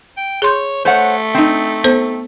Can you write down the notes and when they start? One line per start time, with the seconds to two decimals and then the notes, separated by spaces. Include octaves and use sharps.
0.17 G5
0.42 G#4 C#5 C6 G6
0.85 A3 C5 C#5 F#5
1.34 C4 D#4
1.84 B3 A4 C5